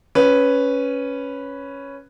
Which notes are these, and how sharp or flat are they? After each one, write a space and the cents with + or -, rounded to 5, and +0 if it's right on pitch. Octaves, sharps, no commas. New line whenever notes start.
C#4 +0 B4 +0